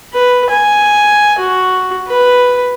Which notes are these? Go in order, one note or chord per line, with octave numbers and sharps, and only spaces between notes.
B4
G#5
F#4
B4